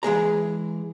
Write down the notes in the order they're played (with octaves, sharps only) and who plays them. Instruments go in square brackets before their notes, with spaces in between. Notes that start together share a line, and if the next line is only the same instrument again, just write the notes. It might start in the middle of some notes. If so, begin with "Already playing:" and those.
[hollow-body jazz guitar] E3 G#3 G#4 A#5